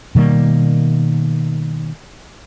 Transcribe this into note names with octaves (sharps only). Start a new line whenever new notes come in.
B2 D#3 G3 A#3